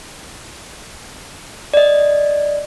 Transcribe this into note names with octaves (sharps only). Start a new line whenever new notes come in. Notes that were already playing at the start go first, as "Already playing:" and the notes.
D5 D#5